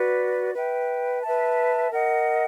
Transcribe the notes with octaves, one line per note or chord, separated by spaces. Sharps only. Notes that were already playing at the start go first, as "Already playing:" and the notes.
Already playing: F#4 B4 D5
B4 E5 G5
B4 E5 A5
A#4 D#5 F#5